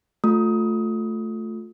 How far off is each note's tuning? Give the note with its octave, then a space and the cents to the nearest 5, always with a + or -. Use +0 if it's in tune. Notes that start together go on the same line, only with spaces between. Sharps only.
A3 +0 F4 +25 D#6 +20